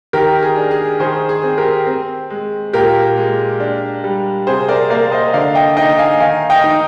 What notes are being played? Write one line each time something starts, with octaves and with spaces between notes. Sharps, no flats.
D#3 G4 A#4
G#4
D4
G#4
D#3 G#4 C5
G#4
C4
G4 A#4
C4
G#3
A#2 G4 A#4
G#3
D4
G3
C3 G#4 C5
A#4 D5
A#3 A#4 D5
C5 D#5
D3 D5 F5
D#5 G5
D#4 D#5 G5
F5 G#5
D#3 F5 G#5
D#5 G5
D#4